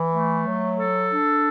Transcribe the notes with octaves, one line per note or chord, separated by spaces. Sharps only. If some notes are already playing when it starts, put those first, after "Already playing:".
Already playing: E3
A3
F#3
A4
D4